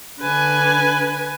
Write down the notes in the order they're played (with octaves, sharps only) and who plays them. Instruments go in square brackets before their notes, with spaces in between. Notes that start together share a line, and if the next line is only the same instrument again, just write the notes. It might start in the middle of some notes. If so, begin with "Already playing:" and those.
[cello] D3 [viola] B4 G#5